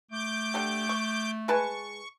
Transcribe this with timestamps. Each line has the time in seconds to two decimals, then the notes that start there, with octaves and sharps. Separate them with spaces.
0.12 A3 D6 G6
0.54 D3 D4 G4
0.89 C#6
1.48 G#3 B4 A5 C#6